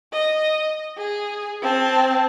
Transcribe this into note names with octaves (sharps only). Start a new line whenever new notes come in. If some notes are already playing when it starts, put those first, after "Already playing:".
D#5
G#4
C4 A5